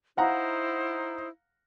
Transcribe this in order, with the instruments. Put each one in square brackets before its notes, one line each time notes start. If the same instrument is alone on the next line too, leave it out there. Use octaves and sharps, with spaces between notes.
[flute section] D#4 E4 C5 [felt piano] F5 F#5 A#5